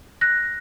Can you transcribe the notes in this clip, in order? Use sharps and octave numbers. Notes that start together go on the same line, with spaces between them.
F#6 A#6